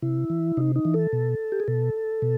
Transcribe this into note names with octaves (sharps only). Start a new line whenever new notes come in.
C3 E4
E3
C3 D#4
D#4
E3
A4
B2
G4
G#4
B2 A4
B2